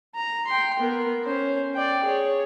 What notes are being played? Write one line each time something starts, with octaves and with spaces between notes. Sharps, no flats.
A#5
G5 C6
B3 A#4
C#4 C5
D5 G5
G#4 C#5